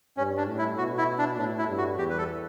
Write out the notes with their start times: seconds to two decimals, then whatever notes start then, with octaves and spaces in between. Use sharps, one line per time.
0.17 G2 C#4
0.37 D4
0.47 A2
0.58 E4
0.78 B2 F#4
0.98 E4
1.18 D4
1.38 A2 D4
1.58 E4
1.68 G2
1.78 F#4
1.98 E2 G4
2.10 B4
2.18 A4